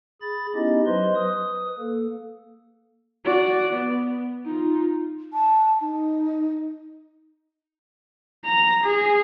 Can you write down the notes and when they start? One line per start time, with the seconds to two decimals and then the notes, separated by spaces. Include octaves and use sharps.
0.22 G#4 B5 A6
0.55 B3 C#4 D#4 E4 G4 D#5
0.86 F#3 B4 C5 D#5 C6
1.16 B4 D#6
1.79 A#3 A4
3.25 F#4 D5
3.73 B3
4.46 D#4 F4
5.33 A5
5.81 D#4
8.45 A#5
8.84 G#4